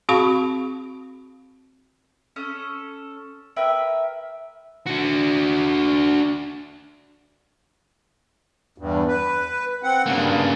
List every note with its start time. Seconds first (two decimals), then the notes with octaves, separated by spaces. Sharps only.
0.09 C4 F#4 G#4 F5 B5 C#6
2.36 C#4 A4 D#6
3.56 A#4 B4 E5 G5
4.86 D4 F#4
8.78 E2 G2
9.08 B4
9.83 C4 F#5
10.06 G2 C#3 A#3